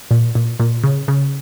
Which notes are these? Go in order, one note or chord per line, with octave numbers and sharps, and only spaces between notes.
A#2
A#2
A#2
C#3
C#3